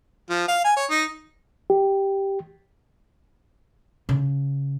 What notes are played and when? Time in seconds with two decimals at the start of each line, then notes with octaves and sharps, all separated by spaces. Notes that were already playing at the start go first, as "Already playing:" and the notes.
0.30 F3
0.48 F5
0.65 G#5
0.77 C#5
0.90 D#4
1.70 G4
4.09 C#3